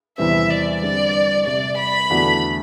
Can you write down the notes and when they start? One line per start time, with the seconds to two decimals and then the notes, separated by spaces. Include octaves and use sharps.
0.18 E2 C3 E3 G3 C4 E5
0.50 D5
0.82 D3 G3 C4 D5
1.45 C3 G3 C4 G4 D5
1.78 B5
2.10 E2 D3 A3 D4 F#4